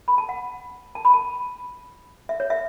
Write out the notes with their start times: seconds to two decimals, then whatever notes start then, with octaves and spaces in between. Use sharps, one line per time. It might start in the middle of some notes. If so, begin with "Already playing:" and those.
0.08 B5
0.18 A5
0.29 F#5
0.95 A5
1.05 B5
1.14 A5
2.29 E5
2.40 C#5
2.50 E5